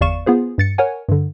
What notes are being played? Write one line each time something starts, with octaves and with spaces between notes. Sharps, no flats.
G1 E2 D5 F5 C#6 E7
B3 F4 G#4 C5
G2 A6 C#7
A#4 C#5 F#5 G#5
G2 D3